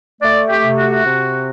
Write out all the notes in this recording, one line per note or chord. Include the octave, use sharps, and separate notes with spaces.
A3 D5
G4
C3
F#4
C3